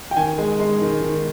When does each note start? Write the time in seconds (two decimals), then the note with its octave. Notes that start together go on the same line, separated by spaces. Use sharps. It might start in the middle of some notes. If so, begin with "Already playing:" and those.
0.11 G5
0.16 D#3 G#5
0.38 G#3
0.60 G#3
0.81 D#3
1.02 D#3